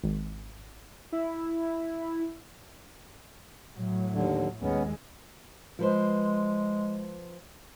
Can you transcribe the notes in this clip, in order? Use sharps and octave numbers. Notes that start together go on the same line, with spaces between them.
G#1
E4
A2 F#3
D#2 D3
D#2 G#3 B3 C#4
F3 G#3 B4 C5